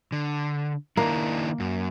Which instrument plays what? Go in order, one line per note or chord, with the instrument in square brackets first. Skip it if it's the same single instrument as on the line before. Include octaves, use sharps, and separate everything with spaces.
[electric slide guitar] D3
[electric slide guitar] D#3 D4 E4 [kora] A#3
[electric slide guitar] F#2